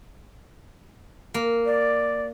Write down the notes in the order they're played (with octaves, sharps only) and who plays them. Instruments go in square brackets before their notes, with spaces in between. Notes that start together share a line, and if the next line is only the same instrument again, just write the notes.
[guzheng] A#3
[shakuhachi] D5